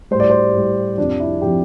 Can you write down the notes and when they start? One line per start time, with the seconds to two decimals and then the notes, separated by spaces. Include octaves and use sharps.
0.11 A2 G3 C5
0.20 D5
0.30 C5
0.54 A2 G3
0.98 F2 C3 F3 D4
1.20 E4
1.42 C3 F3 G4